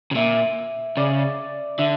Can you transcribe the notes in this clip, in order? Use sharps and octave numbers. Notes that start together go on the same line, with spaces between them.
C#3
A#2 E5
C#3 D5
D3 E5